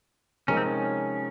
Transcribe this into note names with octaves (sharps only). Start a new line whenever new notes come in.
C3 F3 G#3 C#4 D#4 A#4
C4
C#4